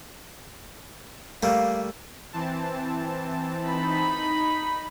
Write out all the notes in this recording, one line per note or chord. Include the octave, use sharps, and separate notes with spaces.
G3 A3 A#3 F5
E3 C4 A5
D#4 B5